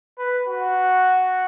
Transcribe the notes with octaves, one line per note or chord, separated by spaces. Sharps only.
B4
F#4